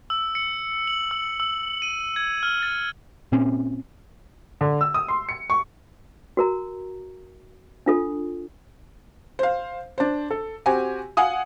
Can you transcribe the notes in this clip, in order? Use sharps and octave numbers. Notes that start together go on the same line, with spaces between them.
E6
C#7
F#7
E6
E6
D#7
G#6
F6
A6
A#2 C4 C#4
D3
E6
D#6
C6
C#7
C#6
F#4 A#4 A#5
D4 F4 A4
C5 F5
D4 C5
A4
C4 F#4 G4 G#5
F5 F#5 G#5 D#6